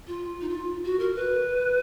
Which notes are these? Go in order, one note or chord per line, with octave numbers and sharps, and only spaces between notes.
F4
D#4
F4
F#4
A#4
B4